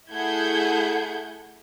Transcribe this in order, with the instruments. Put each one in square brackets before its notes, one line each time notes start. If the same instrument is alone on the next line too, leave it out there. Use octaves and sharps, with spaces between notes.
[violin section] A3 E4 G#4 F#5 G6 G#6